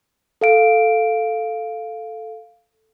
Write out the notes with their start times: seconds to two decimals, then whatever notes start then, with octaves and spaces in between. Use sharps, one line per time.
0.41 A4 F5 D7